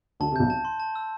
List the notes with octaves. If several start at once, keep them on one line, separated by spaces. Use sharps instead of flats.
D2 D3 A5
C3
B1 B2 G6
A5
C6
A5
E6